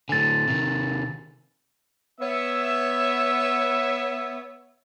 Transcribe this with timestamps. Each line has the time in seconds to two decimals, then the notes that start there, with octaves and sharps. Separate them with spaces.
0.09 A2 D3 G#5 A6
0.48 C3 D#3
2.21 B3 C#5 E5